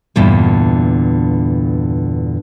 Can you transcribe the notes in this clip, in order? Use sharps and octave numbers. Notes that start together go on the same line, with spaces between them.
E2 G2 A#2 D3